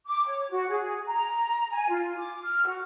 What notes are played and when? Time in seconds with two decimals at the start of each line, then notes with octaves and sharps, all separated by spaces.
0.06 D6
0.27 C#5
0.49 F#4
0.69 G#4
1.07 A#5
1.71 G#5
1.88 F4
2.17 D6
2.42 F6
2.66 F#4